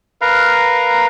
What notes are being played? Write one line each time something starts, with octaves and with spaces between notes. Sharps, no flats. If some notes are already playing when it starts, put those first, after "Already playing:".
A#4 B4 F5 A#5